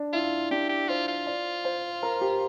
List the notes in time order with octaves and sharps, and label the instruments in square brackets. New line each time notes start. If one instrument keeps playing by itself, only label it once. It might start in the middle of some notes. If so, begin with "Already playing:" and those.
Already playing: [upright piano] D4
[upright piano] E4 [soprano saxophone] F4
[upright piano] D4 [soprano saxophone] G4
[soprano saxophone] G4
[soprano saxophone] F4 [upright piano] C5
[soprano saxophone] F4
[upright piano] D5
C5
A#4
G4